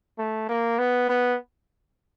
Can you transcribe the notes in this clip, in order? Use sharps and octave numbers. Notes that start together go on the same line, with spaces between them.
A3
A#3
B3
B3